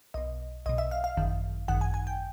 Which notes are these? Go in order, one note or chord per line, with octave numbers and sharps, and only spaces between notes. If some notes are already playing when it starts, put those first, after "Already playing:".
B1 B2 D#5
B1 B2 D#5
E5
F5
F5
G#1 F#2 D#3
G#1 F#2 D#3 F#5
G#5
G#5
G5